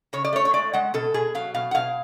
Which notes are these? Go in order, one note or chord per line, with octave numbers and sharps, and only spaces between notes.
C#3 C#5
D5
A3 C#5
C#5
G#3 D5
G#3 F#5
B2 A4
B2 G#4
F#3 F5
B2 F5
F#5
B2 F5